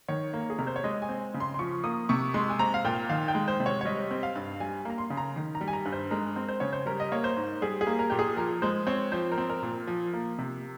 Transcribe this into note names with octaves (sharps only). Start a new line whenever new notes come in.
D#3 C#5
A#3
G#4
C3 A#4
C5
C#5
G#3 D#5
G#5
C4
C#3
C6
C6
F3 C#6
A#3 D#6
C3 C#6
G#3 C6
G#5
C4 A#5
F5
A#2 G5
D#3 F5
G5
G#3
C5
C3
C#5
C#5
G3 D#5
C4
F5
G2
G3 G#5
A#3 A#5
C6
C#3
A#5
D#3
A#5
G3
G#5
A#5
G2
C5
G#3 A#4
C4
C5
C#3 C#5
C5
G3 A#4
D#5
A#3 C#5
C5
G#2
G3 G#4
G#4
A#3
A#4
A#2 G4
G#4
F3 A#4
G#3 C5
C4 C#5
F3 C5
A#4
C4
A#4
A#2
F3
A#3
C3